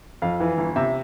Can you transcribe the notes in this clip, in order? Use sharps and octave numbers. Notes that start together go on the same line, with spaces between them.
F2 F5
E3
G1
C3 E5